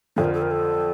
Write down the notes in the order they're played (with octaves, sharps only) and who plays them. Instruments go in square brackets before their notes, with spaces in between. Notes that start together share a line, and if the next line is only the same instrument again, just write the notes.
[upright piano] F2 D3 F3 [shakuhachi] A4
[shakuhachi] A#4
A4
A#4
A4